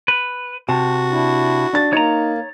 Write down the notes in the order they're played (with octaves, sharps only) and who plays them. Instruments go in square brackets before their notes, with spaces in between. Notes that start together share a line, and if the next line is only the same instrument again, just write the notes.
[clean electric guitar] B4
[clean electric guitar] C3 [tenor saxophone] F#4 [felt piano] A5
[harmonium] D4 E4
[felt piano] D4 A6
[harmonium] A#3 [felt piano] D#4 [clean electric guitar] C#5 A#5